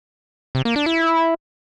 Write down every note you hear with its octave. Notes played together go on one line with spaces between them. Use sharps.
C3
A#3
D4
E4